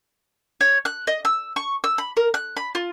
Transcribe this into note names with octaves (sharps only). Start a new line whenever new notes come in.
C#5
F#6
D#5
E6
C#6
E6
B5
A#4
F#6
B5
F4